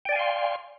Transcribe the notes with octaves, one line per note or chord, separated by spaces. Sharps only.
D5 F5 G5 G#5 C6